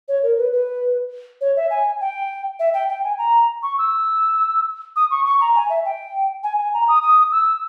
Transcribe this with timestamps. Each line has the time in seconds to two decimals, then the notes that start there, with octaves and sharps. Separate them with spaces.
0.08 C#5
0.23 A#4
0.37 B4
0.52 B4
1.41 C#5
1.56 E5
1.70 G#5
2.00 G5
2.59 E5
2.74 G5
2.89 G5
3.04 G#5
3.18 A#5
3.63 C#6
3.78 E6
4.96 D#6
5.10 C#6
5.26 C#6
5.41 A#5
5.55 G#5
5.70 E5
5.85 G5
6.43 G#5
6.59 G#5
6.74 A#5
6.88 D#6
7.03 D#6
7.32 E6